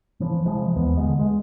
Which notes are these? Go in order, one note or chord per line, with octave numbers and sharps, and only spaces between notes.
E3 F3
C3 E3 F3 G#3
D#2 B3
D3 G#3
G#3